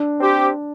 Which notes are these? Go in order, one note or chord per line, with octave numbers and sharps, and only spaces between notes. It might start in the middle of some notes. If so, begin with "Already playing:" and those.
Already playing: D4
C4 G4